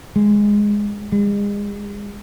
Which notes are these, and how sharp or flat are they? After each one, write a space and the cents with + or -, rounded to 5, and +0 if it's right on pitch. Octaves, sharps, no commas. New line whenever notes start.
G#3 -5
G#3 -35